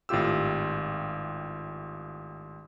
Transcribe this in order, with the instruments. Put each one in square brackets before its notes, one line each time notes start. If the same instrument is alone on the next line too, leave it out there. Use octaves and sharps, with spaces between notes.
[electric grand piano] G#1 A2 F4 G4 E6